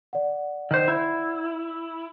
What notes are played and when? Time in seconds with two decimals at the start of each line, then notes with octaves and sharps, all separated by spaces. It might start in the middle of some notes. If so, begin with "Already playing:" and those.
0.13 D5 F#5
0.71 D#3 C5
0.88 E4